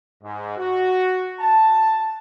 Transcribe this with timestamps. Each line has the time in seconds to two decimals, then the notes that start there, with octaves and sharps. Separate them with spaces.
0.23 G#2
0.58 F#4
1.40 A5